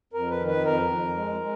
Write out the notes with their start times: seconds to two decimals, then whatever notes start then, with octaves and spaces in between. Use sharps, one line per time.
0.13 F2 A#4
0.30 B4
0.40 D#3
0.47 B4
0.64 F2 A#4
0.90 F2
1.16 G#3
1.41 G#3